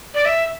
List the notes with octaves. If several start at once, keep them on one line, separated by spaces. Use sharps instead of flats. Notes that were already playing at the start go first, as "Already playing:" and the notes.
D5
E5